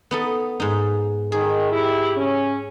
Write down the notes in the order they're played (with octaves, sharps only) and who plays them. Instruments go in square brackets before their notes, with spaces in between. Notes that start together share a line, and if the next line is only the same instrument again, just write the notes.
[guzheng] B3 D#4 A4
G#2 D#4
[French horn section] D#3 [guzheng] G#4
[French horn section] E4 G4
C#4